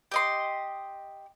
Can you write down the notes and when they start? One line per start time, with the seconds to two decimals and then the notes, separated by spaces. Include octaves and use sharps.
0.12 G4 D#5 C6